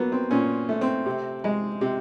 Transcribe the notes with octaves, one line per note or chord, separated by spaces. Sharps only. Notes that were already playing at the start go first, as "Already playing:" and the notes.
Already playing: F#3 A#3 B3
C4
A#2 C#4
A3
C4
C3
G#3
C3